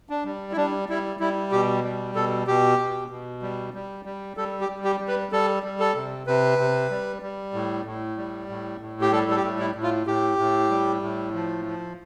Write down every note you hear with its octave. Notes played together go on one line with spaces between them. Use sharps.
D4
G3
E4
G3 D4
G3 E4
G3 E4
B2 G4
G3
B2 A4
B2 G4
B2
B2
G3
G3
G3
G3 A4
G4
G3
G4
G3
B4
G3 A4
G3
A4
C3
C3 B4
C3
G3
G3
A2
A2
G3
A2
A2
G4
G3 A4
A4
G4
A2
E4
A2
F4
A2 G4
A2
G3
A2
F3
F3